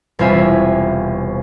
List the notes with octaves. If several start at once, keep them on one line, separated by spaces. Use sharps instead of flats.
E1 C2 C4 F4 E5 G#5